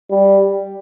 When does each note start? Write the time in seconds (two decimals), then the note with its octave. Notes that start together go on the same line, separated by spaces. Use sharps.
0.11 G3